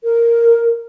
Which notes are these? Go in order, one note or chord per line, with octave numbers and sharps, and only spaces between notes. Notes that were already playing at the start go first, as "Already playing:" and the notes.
A#4